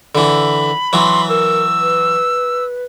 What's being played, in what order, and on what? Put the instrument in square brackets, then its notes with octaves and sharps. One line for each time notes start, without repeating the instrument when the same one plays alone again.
[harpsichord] D3 E3 [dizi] B5
[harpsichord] E3 F#3 [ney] C6
[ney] A#4 [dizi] E6
[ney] B4